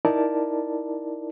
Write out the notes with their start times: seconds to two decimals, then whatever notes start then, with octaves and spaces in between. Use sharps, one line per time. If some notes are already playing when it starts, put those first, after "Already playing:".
0.05 D#4 E4 A#4 D5 A5